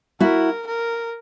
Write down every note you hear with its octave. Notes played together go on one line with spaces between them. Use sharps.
E4 F#4 A#4
A#4